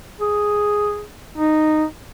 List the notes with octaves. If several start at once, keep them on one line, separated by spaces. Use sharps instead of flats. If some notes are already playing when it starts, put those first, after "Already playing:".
G#4
D#4